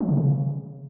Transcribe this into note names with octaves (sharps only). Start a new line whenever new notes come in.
F3
C3
C#3